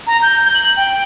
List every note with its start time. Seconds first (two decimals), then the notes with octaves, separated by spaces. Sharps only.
0.07 A#5
0.22 G6
0.54 F#7
0.77 G5